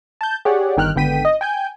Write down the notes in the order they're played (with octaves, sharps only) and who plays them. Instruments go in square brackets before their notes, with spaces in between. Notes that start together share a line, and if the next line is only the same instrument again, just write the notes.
[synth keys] A5 G6
G4 G#4 C#5 D5 F#5
G1 D#3 G5 F6 F#6
G#1 D3 B3 G5 B6 D#7
D#5
G5 G#5 G6